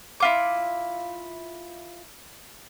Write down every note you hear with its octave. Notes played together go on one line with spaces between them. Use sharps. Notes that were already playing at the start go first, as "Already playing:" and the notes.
E4 F4 D6